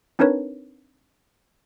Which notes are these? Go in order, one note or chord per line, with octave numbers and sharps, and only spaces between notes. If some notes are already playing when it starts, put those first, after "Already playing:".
C4 D4 D#4 A#4 B4 C#5